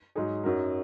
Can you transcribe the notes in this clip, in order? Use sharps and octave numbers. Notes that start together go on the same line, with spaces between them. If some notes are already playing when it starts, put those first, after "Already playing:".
G#2 F#3 D#4 G#4
F#2 F#3 D#4 F#4 A#4